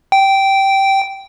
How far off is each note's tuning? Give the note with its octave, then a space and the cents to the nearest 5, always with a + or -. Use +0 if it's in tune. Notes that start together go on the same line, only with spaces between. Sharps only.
G5 -10